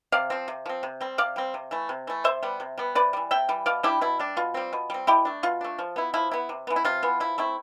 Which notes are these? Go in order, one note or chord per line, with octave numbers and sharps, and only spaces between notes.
C3 D5 F5
F3 C4
C3
F3 C4
C3
G3 C4
C3 D5 F5
G3 C4
C3
E3 A3
C3
E3 A3
C3 C5 E5
G3 B3
C3
G3 B3
C3 B4 D5
E3 G3
C3 E5 G5
E3 G3
B2 D5 F5
G3 D4 E4 G4
B2 E4
G3 D4
B2 F4
G3 C4
B2
G3 C4
B2 E4 G4
A3 D4
B2 F4
A3 D4
F3
B3 E4
F3 E4
B3 E4
C3
E3 B3
E4
C3 F4
E3 B3
F3 E4
A3 C4 E4